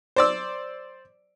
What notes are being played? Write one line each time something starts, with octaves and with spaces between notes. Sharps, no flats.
C5 D5 E6